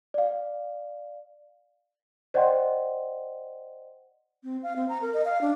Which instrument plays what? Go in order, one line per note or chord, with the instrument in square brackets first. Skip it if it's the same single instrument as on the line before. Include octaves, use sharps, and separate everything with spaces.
[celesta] D5 F5
C5 D5 D#5 F#5 G5 C6
[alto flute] C4
F5
C4
A#5
A#4
D#5
F5
D4